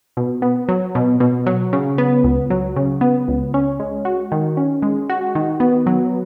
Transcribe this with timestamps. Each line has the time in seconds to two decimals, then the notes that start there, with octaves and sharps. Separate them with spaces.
0.17 B2
0.42 B3
0.69 F#3
0.95 B2
1.20 B2
1.46 F#3
1.73 C#3
1.98 B3
2.24 C#2
2.50 F#3
2.76 C#3
3.01 B3
3.28 C#2
3.54 C#4
3.80 G#3
4.05 F#4
4.32 D#3
4.57 C#4
4.82 G#3
5.09 F#4
5.35 D#3
5.60 B3
5.86 F#3